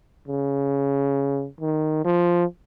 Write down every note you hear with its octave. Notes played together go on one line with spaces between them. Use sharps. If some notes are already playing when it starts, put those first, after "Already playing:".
C#3
D#3
F3